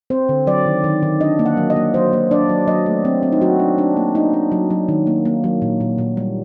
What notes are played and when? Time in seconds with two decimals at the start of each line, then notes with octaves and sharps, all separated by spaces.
0.10 C4 C5
0.29 D3
0.47 F#3 D5
0.66 D#3
0.84 D#3
1.03 D#3
1.20 D4 D#5
1.39 A#3
1.46 F#5
1.57 F#3
1.70 D#5
1.76 A#3
1.94 F#3 C5
2.13 A#3
2.31 D4 D5
2.49 F#3
2.68 F#3 D#5
2.86 A3
3.05 C4
3.23 C4
3.32 D#4
3.41 F#3 F#4
3.59 D4
3.78 D4
3.97 A#3
4.15 D4 D#4
4.33 D4
4.52 F#3
4.70 F#3
4.89 D#3
5.07 A#3
5.25 A#3
5.44 F#3
5.62 A#2
5.80 A#2
5.98 A#2
6.17 G3